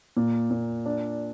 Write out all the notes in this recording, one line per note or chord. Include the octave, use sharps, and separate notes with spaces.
A#2
A#2
D4